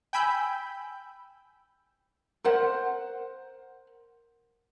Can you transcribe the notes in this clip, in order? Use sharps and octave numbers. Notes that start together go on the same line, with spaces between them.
G5 G#5 B5 E6 G6
A#4 C5 F#5